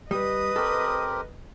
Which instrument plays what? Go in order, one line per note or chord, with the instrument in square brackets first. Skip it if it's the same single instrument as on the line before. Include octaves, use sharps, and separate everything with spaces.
[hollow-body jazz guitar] G3 [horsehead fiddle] B4 D#5 [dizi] D#6
[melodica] C4 G4 A#4 [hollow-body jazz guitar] A4